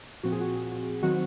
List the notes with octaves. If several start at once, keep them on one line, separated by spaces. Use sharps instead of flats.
A#2 F3 C4 F#4
G#4
F#4
D#3 F#3 C4 F#4